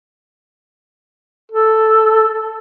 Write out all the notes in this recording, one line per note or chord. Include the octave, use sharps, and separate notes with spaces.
A4